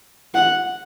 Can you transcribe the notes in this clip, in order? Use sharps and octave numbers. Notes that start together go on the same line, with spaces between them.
F#5